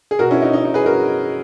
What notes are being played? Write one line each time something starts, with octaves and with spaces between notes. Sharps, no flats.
G#4
B2 F#4 A#4
C#4 E4
D#4
D#4
D#4
G#4 B4
F#4 A#4